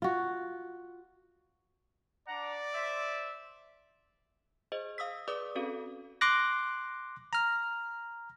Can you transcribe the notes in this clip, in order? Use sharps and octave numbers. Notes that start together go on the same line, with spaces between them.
F4 F#4
D4 D5 F#5 A#5
C5 E5
G#4 C5 D#5
F5 D#6 E6 B6
G#4 B4 D5 D6 D#6
C4 C#4 F#4 A4 F5
C6 D6 F#6 A#6
A#5 F6